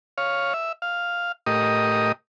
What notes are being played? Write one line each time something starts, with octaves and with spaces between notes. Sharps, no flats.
C#5 F5
E5
F5
A2 G4 A#4 D#5 D#6